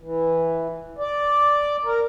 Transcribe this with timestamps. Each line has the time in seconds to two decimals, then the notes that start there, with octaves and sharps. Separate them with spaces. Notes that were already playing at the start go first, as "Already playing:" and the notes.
0.01 E3
0.98 D5
1.84 A#4